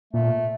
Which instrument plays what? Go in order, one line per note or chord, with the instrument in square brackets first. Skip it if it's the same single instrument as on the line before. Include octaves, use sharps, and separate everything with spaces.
[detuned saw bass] A#2 [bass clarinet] A3